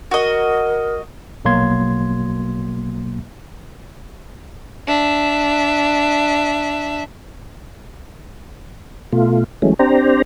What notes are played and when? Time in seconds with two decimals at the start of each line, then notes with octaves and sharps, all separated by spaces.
0.11 F#4 A#4 D#5
1.45 A#1 B2 F#3 A#3 C6 G#6
4.88 D4 E5
9.12 B2 A3 F4
9.62 E3 F#3 G#3 A3 C#4
9.79 C4 D4 G4 C5 A#5